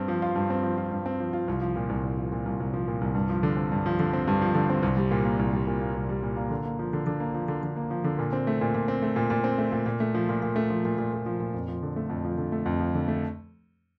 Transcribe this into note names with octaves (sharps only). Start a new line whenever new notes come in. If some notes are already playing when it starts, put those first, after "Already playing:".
Already playing: G2 C4
F3
F4
G2
C4
F3
F4
G2
C4
F3
F4
C2
F3
A#2
C2
C2
F3
A#2
C2
C2
F3
A#2
C2
G2
F3
D3
C4
G2
F3
D3
C4
G2
F3
D3
C4
C2
G3
A#2
A#3
C2
G3
A#2
A#3
C2
G3
A#2
A#3
D3
A#3
F3
D3
D3
A#3
F3
D3
D3
A#3
F3
D3
A#2
C4
A3
A#2
A#2
C4
A3
A#2
A#2
C4
A3
A#2
A#2
A3
F3
A#2
A#2
A3
F3
A#2
A#2
A3
F3
A#2
F2
F3
D3
A3
F2
F3
D3
A3
F2
F3
D3
A3